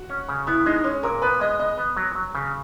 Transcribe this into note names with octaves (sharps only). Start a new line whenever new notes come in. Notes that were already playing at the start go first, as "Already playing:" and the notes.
Already playing: F#4
C#4
C#3
B3 E4
G#3 D#4
G#3 C#4
A#2 A#4
B3 B4
G#3 D#5
B3 D#5
B3
F#3
F#3
C#3